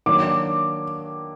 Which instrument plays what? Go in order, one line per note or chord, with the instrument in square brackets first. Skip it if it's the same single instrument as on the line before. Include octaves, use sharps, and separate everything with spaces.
[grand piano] D#3 F#3 A#3 D4 [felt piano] D6